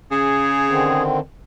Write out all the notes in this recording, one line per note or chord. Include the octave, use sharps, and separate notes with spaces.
C#3 G#4
D3 D#3 C4